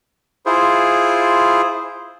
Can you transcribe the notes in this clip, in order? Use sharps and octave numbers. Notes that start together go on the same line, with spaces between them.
E4 F4 G#4 C5